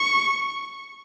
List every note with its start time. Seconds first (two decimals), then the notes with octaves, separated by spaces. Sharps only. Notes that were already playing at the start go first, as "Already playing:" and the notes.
Already playing: C#6